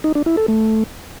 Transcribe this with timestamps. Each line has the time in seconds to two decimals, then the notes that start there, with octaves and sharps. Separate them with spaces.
0.04 D#4
0.15 D4
0.26 E4
0.37 A4
0.48 A3